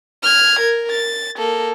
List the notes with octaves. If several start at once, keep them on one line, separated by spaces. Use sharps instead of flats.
F6 G#6
A#4
A6
A#3 A4